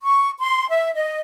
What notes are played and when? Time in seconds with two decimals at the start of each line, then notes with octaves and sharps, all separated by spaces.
0.02 C#6
0.38 C6
0.69 E5
0.94 D#5